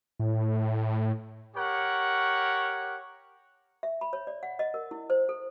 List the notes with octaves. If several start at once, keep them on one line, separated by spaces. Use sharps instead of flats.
A2
G4 A#4 C#5 F#5
E5
B5
C#5
D5
F#5
D#5
A#4
E4
C5
A4